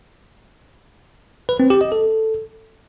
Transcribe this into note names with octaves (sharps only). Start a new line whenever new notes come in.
B4
C4
G4
D#5
A4